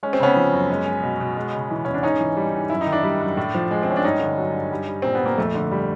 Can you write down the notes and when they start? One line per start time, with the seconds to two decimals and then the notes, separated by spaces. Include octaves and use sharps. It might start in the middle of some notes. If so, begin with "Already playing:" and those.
0.03 G#3 C#4
0.13 C4
0.20 C#3 B3 C#4
0.36 F3
0.53 F#2
0.70 G#3
0.86 G#3
1.03 B2
1.20 B2
1.37 G#3
1.53 C#3
1.70 E3
1.85 E2 C#4
1.94 D4
2.03 G#2 C#4 D#4
2.20 E3
2.37 G3
2.54 G#2
2.70 F#2 E4
2.81 D#4
2.86 D#3
2.92 D4 E4
3.04 G3
3.20 F#2
3.37 A2
3.54 F3
3.71 G#3
3.83 C4
3.87 A2 C#4
3.97 D4
4.04 G2 C#4 D#4
4.20 D3
4.38 F#3
4.54 G2
4.71 G3
4.88 G3
5.02 A#2 C4
5.15 B3
5.21 A#2 A#3
5.38 F2 A3
5.54 D3
5.71 G3